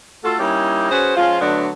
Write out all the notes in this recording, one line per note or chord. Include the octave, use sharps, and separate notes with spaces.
A3 F4 F#4 A4
G3 A#3 C#4 D#4 E4 G4
C#4 F#4 G#4 B4 C5
F3 G#3 C#4 F4
D3 F#3 A3 B3 D4